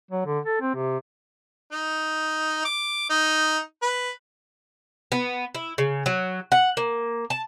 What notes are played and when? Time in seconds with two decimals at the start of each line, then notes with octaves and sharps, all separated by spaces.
0.11 F#3
0.26 D3
0.46 A4
0.61 C4
0.75 C3
1.72 D#4
2.65 D6
3.10 D#4
3.82 B4
5.12 B3
5.55 E4
5.78 C#3
6.06 F#3
6.52 F#5
6.77 A#3
7.30 A5